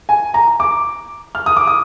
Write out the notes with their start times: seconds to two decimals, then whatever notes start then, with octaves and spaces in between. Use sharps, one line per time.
0.09 G#5
0.34 A#5
0.60 D6
1.35 F6
1.46 D#6
1.56 D6
1.67 D#6